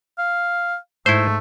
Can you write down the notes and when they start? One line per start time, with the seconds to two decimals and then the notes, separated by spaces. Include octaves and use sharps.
0.18 F5
1.06 G#2 A3 E4 C5